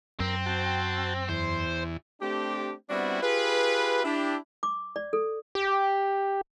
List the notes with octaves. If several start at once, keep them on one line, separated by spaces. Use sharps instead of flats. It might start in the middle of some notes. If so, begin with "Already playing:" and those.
F#2 C4 A#4
F#4 G5 A5
E2 C5
A3 C4 D4 G4
G3 B3 C4 D4 E4 F#4
F4 G4 G#4 B4
D4 E4 G4
D6
D5
A4
G4